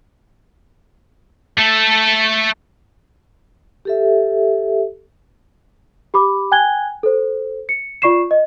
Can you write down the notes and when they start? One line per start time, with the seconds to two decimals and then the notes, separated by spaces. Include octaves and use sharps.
1.59 A3 A4
3.85 G4 A4 E5
6.14 G4 B5 D6
6.52 G5 G#5 F#6 G#6 G7
7.03 A4 C5
7.69 C#7
8.02 F4 D5 C#6 C7 E7
8.31 D#5